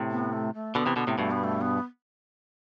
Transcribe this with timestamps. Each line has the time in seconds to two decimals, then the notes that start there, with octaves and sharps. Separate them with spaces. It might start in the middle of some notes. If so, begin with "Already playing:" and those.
Already playing: A2 C3
0.11 B3
0.33 A3
0.54 A3
0.75 B2 D3 B3
0.86 C3 E3
0.96 B2 D3 B3
1.07 A2 C3
1.18 G2 B2 A3
1.31 B3
1.44 A3
1.61 B3